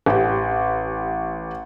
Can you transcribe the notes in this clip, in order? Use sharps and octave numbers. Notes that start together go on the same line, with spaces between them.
A1 G4